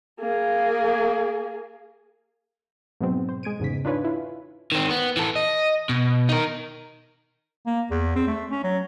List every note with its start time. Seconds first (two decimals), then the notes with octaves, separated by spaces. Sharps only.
0.20 A#3 G#4
3.01 G#2 B2 F#3 C4
3.29 C5
3.43 G#3 G#6 D7 D#7
3.60 E2 G#2 C#3 B6
3.85 D4 D#4 F4 B4 C#5 G#5
4.04 E4 F4
4.72 D#3 C4
4.90 B3
5.17 E3 A4
5.36 D#5
5.89 B2
6.29 D#4 A#4
7.66 A#3
7.91 E2
8.16 C4
8.27 A3
8.51 C#4
8.64 F#3